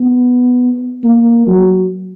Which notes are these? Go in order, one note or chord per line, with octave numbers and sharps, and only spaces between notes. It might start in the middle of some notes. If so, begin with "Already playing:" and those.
Already playing: B3
A#3
F#3